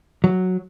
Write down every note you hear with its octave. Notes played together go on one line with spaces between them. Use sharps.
F#3